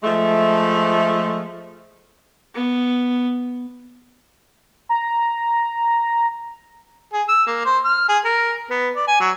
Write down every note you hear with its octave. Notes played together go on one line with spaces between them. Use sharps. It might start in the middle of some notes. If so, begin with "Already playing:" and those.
F3 G#3 A3
B3
A#5
G#4
E6
A#3
C5
F6
G#4
A#4
B3
D5
G#5
F#3